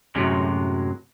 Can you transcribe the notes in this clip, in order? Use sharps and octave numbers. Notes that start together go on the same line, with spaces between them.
F#2 A2 C3 F#3 G#3